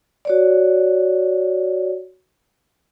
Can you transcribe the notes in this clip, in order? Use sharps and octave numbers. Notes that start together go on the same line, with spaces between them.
F#4 C#5 D5